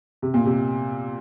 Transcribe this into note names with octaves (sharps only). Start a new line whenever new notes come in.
C3
A#2
C3